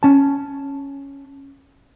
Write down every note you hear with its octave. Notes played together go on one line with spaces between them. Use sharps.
C#4 A5